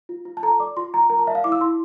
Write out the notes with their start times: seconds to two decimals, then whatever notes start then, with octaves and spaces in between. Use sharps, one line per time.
0.09 F4
0.25 F4
0.37 A5
0.43 A4 A#5
0.60 D5 D6
0.77 F4 C6
0.94 F4 A#5
1.10 A#4 A#5
1.19 A5
1.27 D5 E5
1.35 F5
1.44 E4 D6
1.52 E6
1.61 E4 C6